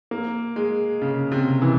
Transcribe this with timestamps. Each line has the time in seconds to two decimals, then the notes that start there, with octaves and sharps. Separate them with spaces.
0.11 A#3
0.56 G#3
1.02 C#3
1.32 C3
1.62 E3